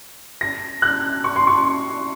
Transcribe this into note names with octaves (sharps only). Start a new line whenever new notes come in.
A#6
F#6
C#6
C6
C#6